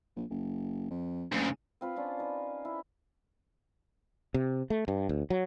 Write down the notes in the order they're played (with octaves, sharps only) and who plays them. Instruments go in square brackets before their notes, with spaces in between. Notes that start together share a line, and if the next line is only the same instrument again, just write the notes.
[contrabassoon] A#1
F#1
F2
[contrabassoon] F#1 [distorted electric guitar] D2 C#3
[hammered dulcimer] C4 F4 B4
C#4 D4 F4
D#4 B4
E4
[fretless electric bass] C3
A3
G2
D2
F#3